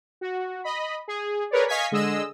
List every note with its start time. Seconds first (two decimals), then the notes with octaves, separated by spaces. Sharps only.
0.21 F#4
0.64 D#5 B5
1.08 G#4
1.51 G#4 A#4 B4 C#5 D5
1.68 D#5 F5 G#5 C#6 G#6 B6
1.91 D3 G#3 G#4 D#5 E6